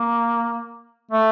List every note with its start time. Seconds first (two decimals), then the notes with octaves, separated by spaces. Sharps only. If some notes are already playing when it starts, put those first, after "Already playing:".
Already playing: A#3
1.11 A3